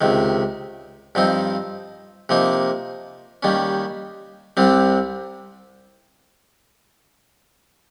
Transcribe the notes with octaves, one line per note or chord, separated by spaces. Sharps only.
C#2 C3 D#3
G2 F3 C4 D#4
C3 F3 A#3 D#4
D#2 D#3 G3 C#4
C2 C3 G3 C4